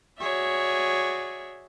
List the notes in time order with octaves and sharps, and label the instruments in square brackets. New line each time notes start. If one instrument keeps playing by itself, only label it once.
[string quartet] F#4 G#4 C#5 D5 E5